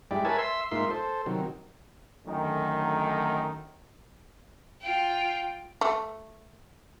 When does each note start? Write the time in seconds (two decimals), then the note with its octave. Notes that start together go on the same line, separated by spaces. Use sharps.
0.11 G2 G#3 E4 G4 D5
0.25 A#4 B4 C#5 E5 G#5 A5
0.39 E5 C6 E6
0.71 G#2 A#3 D#4 F4 E5 C6
0.90 A4 C5
1.26 C3 D#3 F#3
2.26 F#2 D3 D#3 F#3 A3 D#4
4.81 F4 G5
5.81 A3